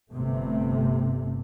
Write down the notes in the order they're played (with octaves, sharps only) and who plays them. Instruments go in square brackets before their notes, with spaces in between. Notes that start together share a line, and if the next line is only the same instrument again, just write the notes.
[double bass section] G1 G2 C3 A3